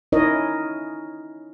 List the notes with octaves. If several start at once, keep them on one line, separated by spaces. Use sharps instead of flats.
C#4 D#4 E4 A#4 C#5 D#5